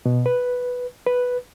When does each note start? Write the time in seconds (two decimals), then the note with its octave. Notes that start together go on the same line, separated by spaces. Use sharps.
0.06 B2
0.26 B4
1.06 B4